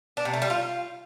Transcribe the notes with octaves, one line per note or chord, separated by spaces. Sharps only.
D4
C3
A3
G3
F4